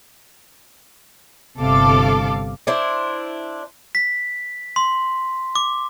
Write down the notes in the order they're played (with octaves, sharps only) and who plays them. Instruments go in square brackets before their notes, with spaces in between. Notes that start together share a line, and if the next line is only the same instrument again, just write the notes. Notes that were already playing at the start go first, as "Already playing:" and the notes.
[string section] G1 C3 A4 F5 D6
[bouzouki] D4 E4 C5
[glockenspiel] B6
C6
D6